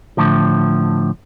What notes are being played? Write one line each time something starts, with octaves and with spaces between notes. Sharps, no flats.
A2 D3 F3